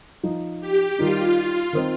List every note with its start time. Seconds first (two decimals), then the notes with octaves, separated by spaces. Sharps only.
0.23 F3 D#4
0.61 G4
0.98 D#3 G3 D#4 F4
1.73 D#3 C4 D#4